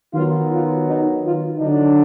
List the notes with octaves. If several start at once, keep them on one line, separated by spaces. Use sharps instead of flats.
D#3 F#3 B3 F4
F4
D#4
F4
D3 F#3 D4 D#4